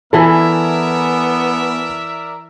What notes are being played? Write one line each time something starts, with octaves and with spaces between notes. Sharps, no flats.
E3 B3 E4 A4 A#4 D5 E5 G#5